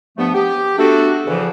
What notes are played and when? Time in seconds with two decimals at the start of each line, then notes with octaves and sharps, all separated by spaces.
0.17 G2 F3 A3 B3
0.34 G4
0.78 A3 B3 D4 F#4 A4
1.27 E2 C#3 E3 F3